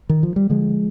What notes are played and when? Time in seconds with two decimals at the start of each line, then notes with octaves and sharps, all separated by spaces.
0.09 D#3
0.23 F3
0.36 G3
0.50 D3 F3 G#3